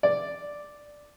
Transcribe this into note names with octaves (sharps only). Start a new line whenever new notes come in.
D5